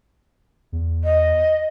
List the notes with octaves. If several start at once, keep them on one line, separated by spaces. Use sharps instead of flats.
E2
D#5